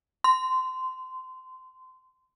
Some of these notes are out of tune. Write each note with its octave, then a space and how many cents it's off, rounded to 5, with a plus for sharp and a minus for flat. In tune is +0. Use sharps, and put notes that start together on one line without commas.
C6 -20